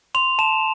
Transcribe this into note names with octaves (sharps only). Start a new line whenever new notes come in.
C6 F7
A5 E7